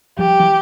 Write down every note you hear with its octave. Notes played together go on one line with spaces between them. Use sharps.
F3 G3 G4
E3 F#3